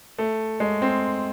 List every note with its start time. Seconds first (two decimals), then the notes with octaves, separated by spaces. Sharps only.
0.18 A3
0.60 G#3
0.82 C4